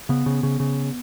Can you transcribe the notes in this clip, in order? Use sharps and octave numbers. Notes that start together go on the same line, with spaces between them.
C#3 B3
C#3
C#3
C#3